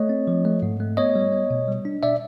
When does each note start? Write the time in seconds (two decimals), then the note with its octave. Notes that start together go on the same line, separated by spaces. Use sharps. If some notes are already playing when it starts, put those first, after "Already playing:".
Already playing: A3 C#5 D#5
0.09 C4
0.27 F3
0.45 A3
0.62 G#2
0.80 A3
0.97 B3 C#5 D#5
1.16 G3
1.32 B3
1.50 B2
1.68 G3
1.85 D4
2.03 B2 D5 E5